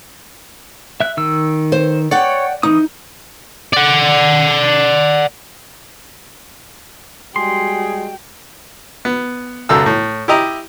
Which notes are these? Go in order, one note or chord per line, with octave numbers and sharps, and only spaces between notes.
E5 F#6
D#3 E6
C5
C#5 D5 F#5 G5
E3 D#4 D#6
D5 F#5
G3 G#3 F#4 G#4 G5 C6
B3
C#2 F#2 A4 E6
A2
E4 G4 D#5 A#5